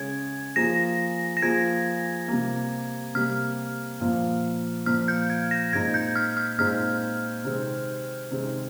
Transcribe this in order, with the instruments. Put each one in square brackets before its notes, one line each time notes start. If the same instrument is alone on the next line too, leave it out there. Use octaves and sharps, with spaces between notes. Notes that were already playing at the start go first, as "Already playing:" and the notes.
Already playing: [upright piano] C#3 G#3 C#4 G#4 [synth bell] G#6
[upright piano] F3 A#3 F4 G#4 [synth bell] A#6
[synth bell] A#6
[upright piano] F3 A#3 F4 G#4 [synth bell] G#6
[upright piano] C3 G3 A#3
[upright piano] C3 G3 A#3 [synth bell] F6
[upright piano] A#2 F3 A#3
[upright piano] A#2 F3 A#3 [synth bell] F6
[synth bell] G6
G#6
A#6
[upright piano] A#2 G#3 C4 D#4 [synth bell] G#6
[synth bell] G6
F6
F6
[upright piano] A#2 G#3 C4 D#4 [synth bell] F6
[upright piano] C3 D#3 G#3 C4
C3 D#3 G#3 C4